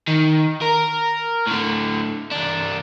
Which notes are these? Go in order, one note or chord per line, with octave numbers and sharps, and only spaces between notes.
D#3
A#4
A2 D3
C2 D4